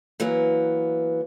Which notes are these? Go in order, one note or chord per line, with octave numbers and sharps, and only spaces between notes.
E3 F#3 A#3 B3